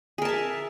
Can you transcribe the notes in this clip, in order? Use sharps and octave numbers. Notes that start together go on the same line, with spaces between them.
G#4 A#4 E5 A5